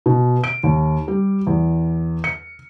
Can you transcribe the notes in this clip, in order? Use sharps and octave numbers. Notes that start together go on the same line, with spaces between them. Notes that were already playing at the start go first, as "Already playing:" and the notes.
B2
D7
D#2
G3
E2
C#7